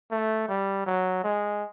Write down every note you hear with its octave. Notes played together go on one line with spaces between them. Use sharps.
A3
G3
F#3
G#3